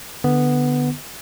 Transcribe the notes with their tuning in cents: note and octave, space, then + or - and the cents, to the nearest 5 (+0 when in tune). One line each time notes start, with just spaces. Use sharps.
D3 +10 B3 +0